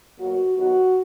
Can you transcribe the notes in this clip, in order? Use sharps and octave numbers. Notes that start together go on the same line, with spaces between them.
B2 F#3 A#3 F#4
D#3 F#3 B3 F#4